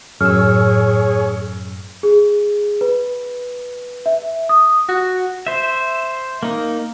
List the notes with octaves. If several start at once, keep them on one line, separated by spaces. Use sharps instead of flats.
F#2 A2 G#4 C#5 E6 F6
G#4
B4
E5
D#6
F#4
C5 E5
A#3 D#4